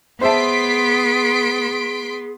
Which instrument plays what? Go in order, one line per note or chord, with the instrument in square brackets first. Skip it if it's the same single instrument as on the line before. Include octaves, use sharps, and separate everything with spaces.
[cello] B3 [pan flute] G#4 [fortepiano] C5 E5 A5 [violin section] C6 B6 D7